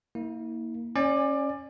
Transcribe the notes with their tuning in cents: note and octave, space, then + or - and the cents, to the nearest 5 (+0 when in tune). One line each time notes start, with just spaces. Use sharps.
A#3 +0 E4 -40
C#4 -15 D5 +20 G#5 +0